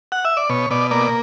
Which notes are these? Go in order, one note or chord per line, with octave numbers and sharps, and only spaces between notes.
F#5
E5
D5
B2 C#5
B2 D5
A#3 D5